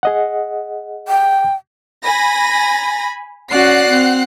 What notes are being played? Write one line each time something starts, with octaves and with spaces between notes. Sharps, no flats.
G#4 D#5 F#5
G5
G#5 B5 A#6
C#4 F#4 D5 F#5 F#6 C7
C4